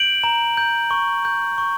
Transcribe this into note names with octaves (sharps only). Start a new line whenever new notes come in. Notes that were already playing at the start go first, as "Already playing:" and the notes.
Already playing: G6 D7 F#7
A#5
G6
C#6
G6
C#6